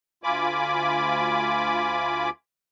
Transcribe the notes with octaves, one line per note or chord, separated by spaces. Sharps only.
D2 F4 G#5 B5 D6